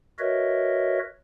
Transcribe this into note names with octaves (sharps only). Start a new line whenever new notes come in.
F#4 A#4 B4 C#5 D#5 E5